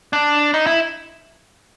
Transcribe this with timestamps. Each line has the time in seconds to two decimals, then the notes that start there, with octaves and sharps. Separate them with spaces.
0.13 D4
0.54 D#4
0.66 E4